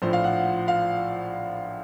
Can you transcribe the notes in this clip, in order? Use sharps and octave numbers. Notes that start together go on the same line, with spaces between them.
A#1 A2 F3 C5
F5
F#5
F5